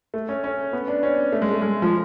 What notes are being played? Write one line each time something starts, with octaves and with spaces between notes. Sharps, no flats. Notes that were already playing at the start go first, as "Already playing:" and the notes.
A3
C#4
C#4
B3
D4
C#4
A3
G#3
A3
G#3
F3